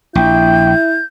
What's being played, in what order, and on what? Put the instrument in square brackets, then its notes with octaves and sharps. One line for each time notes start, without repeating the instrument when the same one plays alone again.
[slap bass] A#1 [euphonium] E4 [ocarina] G5 [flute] G6